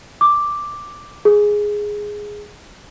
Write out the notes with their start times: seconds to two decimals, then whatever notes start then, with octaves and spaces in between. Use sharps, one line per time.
0.21 D6
1.25 G#4